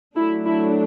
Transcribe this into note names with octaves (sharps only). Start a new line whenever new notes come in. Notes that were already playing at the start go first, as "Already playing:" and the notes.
F#3 A3 D4 E4
E4